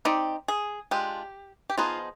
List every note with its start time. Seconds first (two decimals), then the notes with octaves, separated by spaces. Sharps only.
0.05 C4 D#4 G4 D5
0.48 G#4
0.91 G#3 D4 F4 G4
1.70 G4
1.77 F3 B3 D#4 F4 G#4 C5